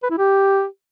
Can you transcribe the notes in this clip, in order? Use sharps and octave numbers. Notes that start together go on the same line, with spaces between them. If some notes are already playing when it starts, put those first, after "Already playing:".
B4
E4
G4